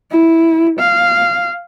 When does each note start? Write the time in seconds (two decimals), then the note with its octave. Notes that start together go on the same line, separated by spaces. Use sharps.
0.11 E4
0.79 F5